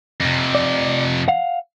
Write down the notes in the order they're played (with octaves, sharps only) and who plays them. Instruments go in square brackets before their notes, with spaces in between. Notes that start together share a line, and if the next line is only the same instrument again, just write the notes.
[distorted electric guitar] F2 C3
[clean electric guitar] D5
F5 F#5